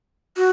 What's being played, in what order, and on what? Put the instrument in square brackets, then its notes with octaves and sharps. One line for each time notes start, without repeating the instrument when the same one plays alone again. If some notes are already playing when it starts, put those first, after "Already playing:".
[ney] F#4